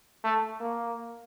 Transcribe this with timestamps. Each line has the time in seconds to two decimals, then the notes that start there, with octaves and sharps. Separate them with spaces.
0.24 A3
0.60 A#3